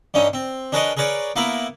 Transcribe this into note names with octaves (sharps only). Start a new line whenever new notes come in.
G2 D3 C#4 D#4
C4
D4 G#4 A#4 B4 C#5 D#5
G#4 A#4 B4 C#5 D5
A#3 B3 E4 A#4 B5